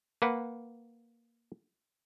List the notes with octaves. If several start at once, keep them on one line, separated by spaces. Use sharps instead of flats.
A#3 B4 F#5